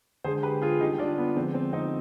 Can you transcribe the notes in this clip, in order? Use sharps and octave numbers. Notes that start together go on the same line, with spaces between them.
D3 G#3 G#4 C5
G4 B4
F4 G#4
D3 G3 D#4 G4
D4 F4
B3
D3 F3 G#3 C4
C4
C4 D#4